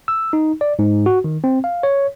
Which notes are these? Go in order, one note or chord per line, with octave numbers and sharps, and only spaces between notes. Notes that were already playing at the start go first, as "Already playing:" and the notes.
E6
D#4
D5
G#2
F#4
D#3
C4
F5
C#5